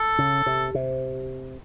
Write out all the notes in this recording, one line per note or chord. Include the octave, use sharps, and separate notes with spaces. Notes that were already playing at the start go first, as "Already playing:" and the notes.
Already playing: A4
C#3
C3
C3